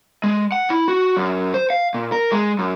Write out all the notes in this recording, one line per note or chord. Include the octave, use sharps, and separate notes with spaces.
G#3
F#5
E4
F#4
F#2
C5
F5
A#2
A#4
G#3
F#2